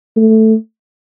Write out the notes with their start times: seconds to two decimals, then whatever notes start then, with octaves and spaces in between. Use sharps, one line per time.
0.16 A3